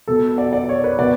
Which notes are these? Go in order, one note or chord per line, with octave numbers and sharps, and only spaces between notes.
B2 A4
D5
D5
C#5
B4
B2 D5